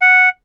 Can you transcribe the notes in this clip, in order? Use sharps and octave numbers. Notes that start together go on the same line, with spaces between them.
F#5